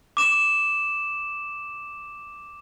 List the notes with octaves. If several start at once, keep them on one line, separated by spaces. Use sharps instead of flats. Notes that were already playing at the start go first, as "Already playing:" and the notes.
D6 E7